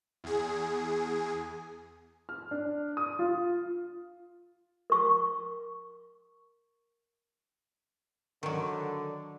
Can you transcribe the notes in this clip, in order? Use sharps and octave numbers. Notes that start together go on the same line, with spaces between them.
E2 G#4
F6
D4
D#6
F4
A#4 C#6
D3 D#3 F#3